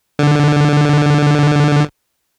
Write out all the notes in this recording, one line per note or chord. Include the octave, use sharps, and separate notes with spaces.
D3